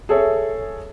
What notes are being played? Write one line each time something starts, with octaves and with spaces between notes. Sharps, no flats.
G#4 A4 C#5 E5